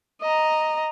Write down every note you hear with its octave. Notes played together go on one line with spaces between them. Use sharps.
D#5 A#5